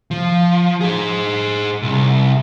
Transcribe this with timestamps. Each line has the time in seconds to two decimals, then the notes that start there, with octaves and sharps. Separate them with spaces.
0.11 F3
0.81 G#4 C5
1.83 C2